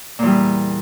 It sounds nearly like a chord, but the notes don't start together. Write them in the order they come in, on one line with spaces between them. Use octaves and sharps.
A#2 E2 G3